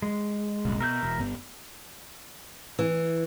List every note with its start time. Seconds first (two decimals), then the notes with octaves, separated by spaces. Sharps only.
0.02 G#3
0.65 F#1 C2 A#2
0.81 B2 A#4 E5 G6
1.03 E1
1.19 G1 G2 B3
2.79 E3